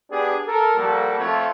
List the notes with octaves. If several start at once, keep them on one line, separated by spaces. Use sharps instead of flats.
B3 D4 G4 G#4
A4 A#4
F3 G3 A#3 F#4 A4
F3 A3 C4 F4 A4 C#5